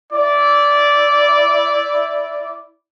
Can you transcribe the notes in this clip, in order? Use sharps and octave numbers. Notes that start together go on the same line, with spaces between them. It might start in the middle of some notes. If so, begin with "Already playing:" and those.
E4 D5